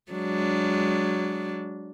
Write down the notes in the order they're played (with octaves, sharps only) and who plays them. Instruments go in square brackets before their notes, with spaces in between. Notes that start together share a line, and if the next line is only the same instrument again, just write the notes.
[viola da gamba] F#3 G#3 D4